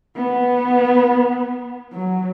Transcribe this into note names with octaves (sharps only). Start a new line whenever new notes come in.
B3
F#3